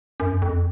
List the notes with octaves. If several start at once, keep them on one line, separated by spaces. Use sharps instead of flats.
F#2
F2